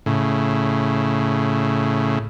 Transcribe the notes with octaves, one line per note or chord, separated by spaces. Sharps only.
A2 C#3